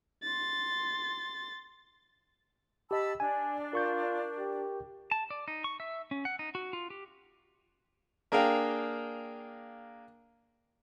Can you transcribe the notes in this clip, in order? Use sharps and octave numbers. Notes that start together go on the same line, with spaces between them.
C6 A6
G4 D#5 A5 B5 E6
D4 G#5
F4 A#4 C#6 G6
G4
A5
D5
D#4
C#6
E5
C#4
F#5
D#4
F#4
F4
G4
A#3 D4 G#4 A#4 F5 G5